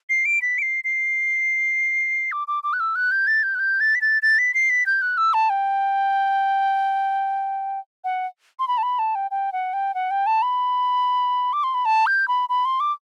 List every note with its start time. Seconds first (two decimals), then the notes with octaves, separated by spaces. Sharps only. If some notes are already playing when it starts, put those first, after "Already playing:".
0.10 C7
0.25 D7
0.42 B6
0.58 D7
0.62 C7
0.84 C7
2.32 D6
2.48 D6
2.64 D6
2.73 F#6
2.80 E6
2.95 F#6
3.11 G6
3.27 A6
3.43 G6
3.55 F#6
3.59 G6
3.80 A6
3.95 B6
4.02 A6
4.22 A6
4.39 B6
4.54 C7
4.70 B6
4.86 G6
5.02 F#6
5.17 E6
5.34 A5
5.50 G5
8.04 F#5
8.59 C6
8.68 B5
8.78 A5
8.83 B5
8.99 A5
9.15 G5
9.31 G5
9.53 F#5
9.73 G5
9.95 F#5
10.11 G5
10.26 A5
10.42 B5
11.53 D6
11.64 C6
11.74 B5
11.85 A5
12.07 G6
12.28 B5
12.49 B5
12.65 C6
12.80 D6